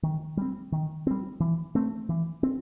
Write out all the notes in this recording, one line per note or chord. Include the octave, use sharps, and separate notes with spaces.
D#3
G3 C4
D#3
G3 C4
E3
A3 C4
E3
C4